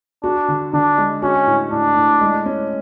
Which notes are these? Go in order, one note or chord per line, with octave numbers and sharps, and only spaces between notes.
D4 F#4
D3
D3 D4
G#3
C#4 F#4
A2
A2 D4
A2
G#3
C#4